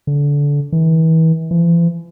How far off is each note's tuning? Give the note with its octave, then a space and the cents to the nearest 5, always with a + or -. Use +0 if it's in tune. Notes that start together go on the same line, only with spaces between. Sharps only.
D3 -25
E3 -35
E3 +45